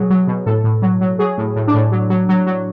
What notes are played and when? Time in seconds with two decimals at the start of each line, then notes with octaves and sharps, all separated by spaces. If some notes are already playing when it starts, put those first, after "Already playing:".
Already playing: B2 F#3 G#4
0.10 F#3
0.27 B2
0.46 A2 A4
0.64 A2
0.82 F#3
1.01 F#3
1.19 F#3 G#4
1.38 A2
1.56 A2
1.68 D4
1.74 A2
1.92 F#3
2.10 F#3
2.29 F#3
2.47 F#3